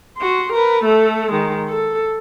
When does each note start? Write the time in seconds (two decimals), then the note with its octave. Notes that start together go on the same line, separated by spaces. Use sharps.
0.18 F#4 C6
0.53 A#4 B4
0.84 A3 A4
1.32 D#3 G#3
1.69 A4